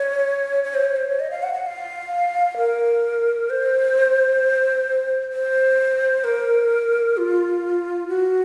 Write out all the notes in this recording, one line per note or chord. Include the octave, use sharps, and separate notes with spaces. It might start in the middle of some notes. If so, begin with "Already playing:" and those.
Already playing: C#5
C#5
C5
C#5
C5
C#5
D#5
F5
F#5
F#5
F5
A#4
C5
C5
A#4
F4
F#4